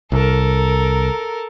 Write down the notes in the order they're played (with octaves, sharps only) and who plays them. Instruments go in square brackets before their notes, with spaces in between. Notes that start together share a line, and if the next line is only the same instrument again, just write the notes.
[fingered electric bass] C2 [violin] A4 A#4